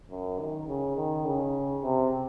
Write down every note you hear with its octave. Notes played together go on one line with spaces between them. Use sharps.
F#2
D#3
C#3
D#3
C#3
C3